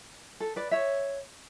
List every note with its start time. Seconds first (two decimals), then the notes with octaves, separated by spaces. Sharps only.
0.40 A4
0.56 B4 D5
0.71 C#5 E5